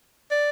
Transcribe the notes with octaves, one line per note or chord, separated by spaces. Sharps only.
D5